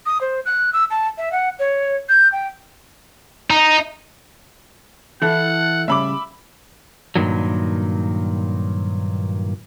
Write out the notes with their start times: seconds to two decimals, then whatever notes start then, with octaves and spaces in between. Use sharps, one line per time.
0.06 D#6
0.21 C5
0.46 F#6
0.73 E6
0.90 A5
1.18 E5
1.32 F#5
1.59 C#5
2.09 G6
2.32 G5
3.51 D#4
5.22 E3 E4 A4 F#5
5.88 A2 C#3 G3 E5 B5 D6
7.16 G2 A#2 D#3 F#3